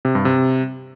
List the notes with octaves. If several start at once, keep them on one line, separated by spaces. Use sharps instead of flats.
C3
G2
C3